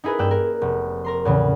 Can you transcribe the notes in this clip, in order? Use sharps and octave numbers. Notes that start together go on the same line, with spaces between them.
D#4 E4 G#4 A#4 B4
G2 A#3 G5 E6 F#6
E4 A#4
F1
A#4 A#5 C6
E2 A2 C#3